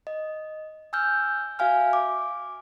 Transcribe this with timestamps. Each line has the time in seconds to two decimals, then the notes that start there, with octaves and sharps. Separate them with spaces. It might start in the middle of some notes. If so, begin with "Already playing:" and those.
0.07 D#5
0.93 G#5 E6 F6 G6
1.59 F#4 E5 F5 G#5 F6
1.93 D6